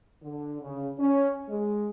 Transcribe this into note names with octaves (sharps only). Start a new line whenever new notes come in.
D3
C#3
C#4
G#3